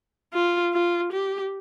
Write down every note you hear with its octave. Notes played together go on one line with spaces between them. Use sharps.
F4
F4
G4